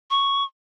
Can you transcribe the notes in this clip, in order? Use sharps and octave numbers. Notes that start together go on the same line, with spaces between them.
C#6